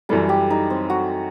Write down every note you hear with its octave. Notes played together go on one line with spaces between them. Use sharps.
F#2 E3 G3 A4
G4
D#4
C4
F#4